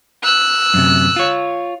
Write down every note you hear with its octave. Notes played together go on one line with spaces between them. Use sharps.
E6 F#6
F#2 C3
F4 C#5